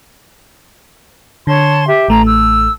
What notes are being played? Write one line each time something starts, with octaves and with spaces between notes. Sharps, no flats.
D3 C#5 A5 C6
G4 E5
A1 A3 A5 A#5
E6